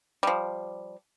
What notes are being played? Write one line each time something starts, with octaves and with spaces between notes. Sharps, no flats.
F3 G3